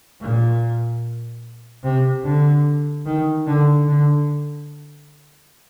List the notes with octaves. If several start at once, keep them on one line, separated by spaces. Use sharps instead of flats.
A#2
C3
D3
D#3
D3
D3